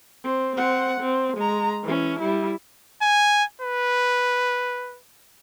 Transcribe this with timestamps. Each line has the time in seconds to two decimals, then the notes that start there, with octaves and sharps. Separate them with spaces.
0.24 C4
0.56 C4 F#5
1.00 C4
1.37 G#3 A#5
1.83 E3 C#4
2.20 G3 E4
3.02 G#5
3.62 B4